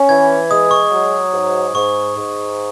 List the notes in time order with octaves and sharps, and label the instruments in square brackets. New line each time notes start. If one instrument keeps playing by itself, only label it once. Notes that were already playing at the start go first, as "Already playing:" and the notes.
Already playing: [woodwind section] C#4
[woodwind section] E3 [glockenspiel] G#6
[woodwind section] G#3 [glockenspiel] D#6
[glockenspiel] C#6
[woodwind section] F#3
G#2
[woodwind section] G#2 [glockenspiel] C#6
[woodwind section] G#2